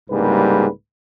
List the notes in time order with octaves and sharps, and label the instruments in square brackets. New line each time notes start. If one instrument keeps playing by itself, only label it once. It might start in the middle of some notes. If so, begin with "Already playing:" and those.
[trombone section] C2 G#2 C#3 G3 A#3 B4